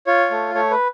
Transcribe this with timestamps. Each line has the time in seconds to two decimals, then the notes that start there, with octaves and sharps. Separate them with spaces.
0.07 F4 C#5
0.31 A3
0.55 A3 C#5
0.71 B4